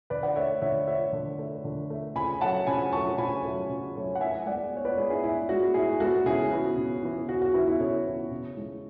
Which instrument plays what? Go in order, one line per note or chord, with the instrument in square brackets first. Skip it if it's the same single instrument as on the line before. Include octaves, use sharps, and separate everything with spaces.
[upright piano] D3 B4 D5
D5 F#5
A3 C#5 E5
D3 C#5 E5
A3 C#5 E5
D3
A3
D3
A3
C#3 G#5 B5
F#3 A3 F#5 A5
C#3 G#5 B5
F#3 A3 A5 C#6
C#3 G#5 B5
F#3 A3
C#3
F#3 A3
F#5
A2 E5 G#5
G#3 B3 D5 F#5
A2 C#5
B4 D5
C#5
G#3 B3 G#4 B4
E4 G#4
A2 E4
G#3 B3 F#4
A2 E4 G#4
G#3 B3 F#4 A4
C#3 E4 G#4
E3 B3 F#4
C#3
E3 B3
C#3 F#4
F#4
E3 B3 E4
E4
C#3 A4 C#5
E3 B3
C#3
E3 G#3